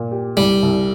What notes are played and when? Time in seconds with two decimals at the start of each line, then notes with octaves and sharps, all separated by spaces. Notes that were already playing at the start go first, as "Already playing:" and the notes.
Already playing: A#2
0.12 G4
0.37 C2 G3
0.63 C2